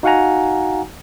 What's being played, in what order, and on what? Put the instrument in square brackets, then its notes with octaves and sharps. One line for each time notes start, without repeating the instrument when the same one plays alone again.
[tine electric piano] D#4 F#4 F5 F#5 G#5 A#5